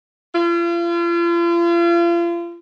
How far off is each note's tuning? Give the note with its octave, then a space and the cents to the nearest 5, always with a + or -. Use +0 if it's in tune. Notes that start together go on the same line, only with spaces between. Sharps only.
F4 -40